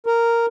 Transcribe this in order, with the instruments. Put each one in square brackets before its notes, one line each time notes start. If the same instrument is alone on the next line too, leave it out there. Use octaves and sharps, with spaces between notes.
[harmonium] A#4